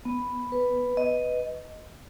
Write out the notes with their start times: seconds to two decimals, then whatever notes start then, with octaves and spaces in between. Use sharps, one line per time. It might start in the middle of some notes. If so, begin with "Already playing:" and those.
0.05 B3
0.52 B4
0.97 D#5